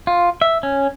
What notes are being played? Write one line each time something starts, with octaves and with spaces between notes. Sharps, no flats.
F4
E5
C#4